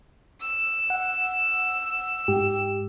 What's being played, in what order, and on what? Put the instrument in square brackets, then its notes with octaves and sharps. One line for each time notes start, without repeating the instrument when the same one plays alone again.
[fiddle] E6
[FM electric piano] F#5
G#2 G4